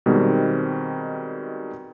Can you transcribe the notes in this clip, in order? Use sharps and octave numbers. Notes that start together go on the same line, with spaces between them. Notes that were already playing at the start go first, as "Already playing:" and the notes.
B2 D#3 G3 G#3 C4